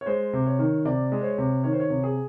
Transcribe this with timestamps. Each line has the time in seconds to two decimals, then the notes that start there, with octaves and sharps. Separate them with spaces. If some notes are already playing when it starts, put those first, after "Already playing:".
0.01 C#5
0.06 G#3 C5
0.33 C3
0.46 C#5
0.59 D#3
0.85 C3 D5
1.12 G#3
1.21 C5
1.24 C#5
1.38 C3
1.64 D#3 C#5
1.72 C5
1.80 C#5
1.90 C3
2.04 G#4